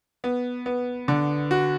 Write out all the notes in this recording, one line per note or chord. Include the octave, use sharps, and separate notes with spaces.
B3
B3
D3
F#4